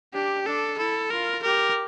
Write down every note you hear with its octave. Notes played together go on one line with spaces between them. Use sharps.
D4 G4
D4 A4
E4 A4
F4 A#4
G4 A#4